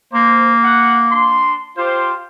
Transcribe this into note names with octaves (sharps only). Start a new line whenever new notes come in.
A#3 C5
F#5
D4 C6
F4 G4 C5